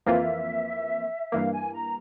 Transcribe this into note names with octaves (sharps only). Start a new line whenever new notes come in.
F2 E3 A#3 F4 E5
G2 E3 A#3 F5
G#5
A#5